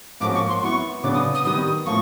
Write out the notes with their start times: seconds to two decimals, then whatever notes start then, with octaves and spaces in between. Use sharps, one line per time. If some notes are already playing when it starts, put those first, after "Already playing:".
0.20 G#2 F3 A#3 C#4 F#4 D6
0.34 C#6
0.48 C6
0.62 F#3 B3 E4 C#6
1.03 C#3 F#3 B3 D4 D6
1.14 D#6
1.34 D#6
1.45 D#3 G3 B3 D#6
1.86 A2 F3 A#3 C#6